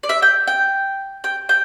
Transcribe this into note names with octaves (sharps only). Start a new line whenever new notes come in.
D5
E5
G5
G5
G5
G5